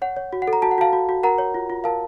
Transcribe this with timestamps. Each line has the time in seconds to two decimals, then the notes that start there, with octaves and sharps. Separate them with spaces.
0.02 C#5 F#5
0.17 C#5
0.33 F#4
0.42 F#5
0.47 A4
0.53 A#5
0.62 F#4 A5
0.71 F#5
0.78 F#4 F5 A5
0.93 F#4
1.09 F#4
1.23 A#4 F#5 A#5
1.38 C#5
1.54 F4
1.70 F4
1.84 A#4 F5 A5